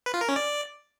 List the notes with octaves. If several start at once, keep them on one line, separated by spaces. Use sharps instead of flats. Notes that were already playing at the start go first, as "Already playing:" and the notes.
B4
F4
A#4
C#4
D5